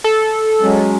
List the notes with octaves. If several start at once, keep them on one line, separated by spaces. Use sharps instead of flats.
A4
F#3 G#3 C#4